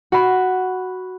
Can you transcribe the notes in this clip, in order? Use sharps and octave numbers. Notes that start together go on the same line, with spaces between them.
F#4 B5